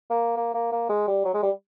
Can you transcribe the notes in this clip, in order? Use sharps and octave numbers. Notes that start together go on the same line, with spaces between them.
A#3
A#3
A#3
A#3
G#3
G3
F#3
G#3
G3